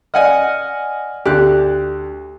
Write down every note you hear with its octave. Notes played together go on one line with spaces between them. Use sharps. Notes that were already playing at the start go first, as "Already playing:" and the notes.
D5 D#5 F#5 G#5 F6
D2 G4 F#6